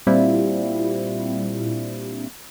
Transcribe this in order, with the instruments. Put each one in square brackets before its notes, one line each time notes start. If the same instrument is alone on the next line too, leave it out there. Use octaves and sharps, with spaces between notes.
[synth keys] A#2 G3 C4 D4 E4 F4